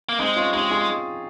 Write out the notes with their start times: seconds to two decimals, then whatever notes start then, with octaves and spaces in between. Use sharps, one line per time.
0.09 A#3
0.19 G#3 C4 D#4
0.36 C#4 F4
0.53 G#3 D#4 G4
0.71 F4 G#4